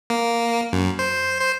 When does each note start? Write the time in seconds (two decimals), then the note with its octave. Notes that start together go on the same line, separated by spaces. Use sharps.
0.10 A#3
0.73 F#2
0.99 C5
1.41 C5